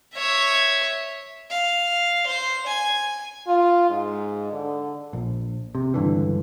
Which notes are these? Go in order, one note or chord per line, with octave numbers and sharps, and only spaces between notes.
C#5 E5
F5
C5
G#5
F4
G#2
D3
A#1
C3
C#2 G2 D3 E3